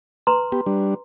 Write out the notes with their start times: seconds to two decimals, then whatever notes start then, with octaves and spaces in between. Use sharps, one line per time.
0.27 B4 A#5 C6
0.52 B3 G4
0.66 G3 D4